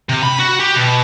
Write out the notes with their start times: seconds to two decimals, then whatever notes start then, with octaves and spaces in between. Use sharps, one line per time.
0.09 C3
0.23 B5
0.40 F#4
0.60 G4
0.77 B2